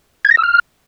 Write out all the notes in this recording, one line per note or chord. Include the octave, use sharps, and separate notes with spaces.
G#6
A#6
E6
F6